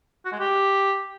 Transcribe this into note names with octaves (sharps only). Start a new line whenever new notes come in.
F#4
G#3
G4